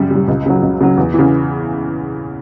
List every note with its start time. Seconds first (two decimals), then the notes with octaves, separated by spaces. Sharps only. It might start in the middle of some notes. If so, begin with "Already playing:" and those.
Already playing: F#2 C#3 G3
0.11 C#3 G3
0.28 C#2
0.46 C#3 F#3
0.62 C#2
0.81 C#3 F#3
0.97 E2
1.14 E3
1.19 C#3